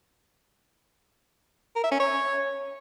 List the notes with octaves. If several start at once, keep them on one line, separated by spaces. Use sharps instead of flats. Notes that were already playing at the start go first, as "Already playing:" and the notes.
A#4
E5
C#4
C#5